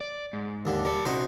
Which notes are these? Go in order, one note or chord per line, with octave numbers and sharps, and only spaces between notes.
D5
G#2
D#2 D3
G3 A#4 A5
C3 C#4 D#4 F#4 C5